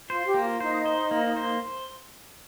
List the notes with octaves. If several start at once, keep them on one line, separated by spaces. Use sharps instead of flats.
F4 C5
G4
A#3
F4
D#4 C5
C5
A#3
C5